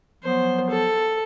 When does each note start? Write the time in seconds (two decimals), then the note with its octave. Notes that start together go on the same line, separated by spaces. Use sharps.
0.24 F3 F#3 B3 C5
0.70 A4